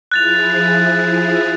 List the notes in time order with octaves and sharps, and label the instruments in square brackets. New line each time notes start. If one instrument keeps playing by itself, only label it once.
[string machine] F3 E4 G#4 [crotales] F#6 A6 F7